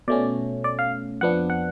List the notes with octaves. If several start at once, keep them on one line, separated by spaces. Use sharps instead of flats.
B2 A3 C#4 D5
D5
F5
F2 F3 B3 D4 F#5
F#5